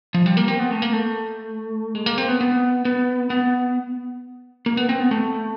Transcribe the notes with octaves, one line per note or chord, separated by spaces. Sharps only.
F3
G3
A#3
C4
B3
A3
A#3
A3
G#3
A#3
C4
B3
B3
B3
B3
A#3
B3
C4
B3
A3